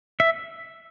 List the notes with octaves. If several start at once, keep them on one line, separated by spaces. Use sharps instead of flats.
E5